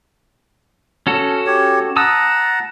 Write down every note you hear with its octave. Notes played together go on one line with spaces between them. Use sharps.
C#4 F#4 A4
G4 C#5
F#5 A5 A#5 D#6 E6